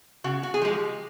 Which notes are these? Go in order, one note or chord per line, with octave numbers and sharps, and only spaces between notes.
C#3 F#4
F#4
G#4
F3 G#3 G4